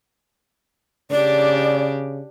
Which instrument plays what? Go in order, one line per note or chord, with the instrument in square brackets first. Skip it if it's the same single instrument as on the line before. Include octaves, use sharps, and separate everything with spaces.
[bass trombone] C#3 [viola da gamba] D4 G4 [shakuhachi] D5